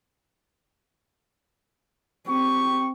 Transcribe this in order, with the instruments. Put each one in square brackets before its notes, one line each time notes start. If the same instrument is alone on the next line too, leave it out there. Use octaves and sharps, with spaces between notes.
[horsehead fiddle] C4 [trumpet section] G4 C#6